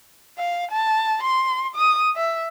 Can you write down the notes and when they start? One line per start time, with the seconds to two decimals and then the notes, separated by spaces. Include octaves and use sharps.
0.38 F5
0.72 A5
1.24 C6
1.76 D#6
2.16 E5